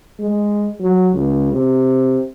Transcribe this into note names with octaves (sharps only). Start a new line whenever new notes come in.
G#3
F#3
C#2
C3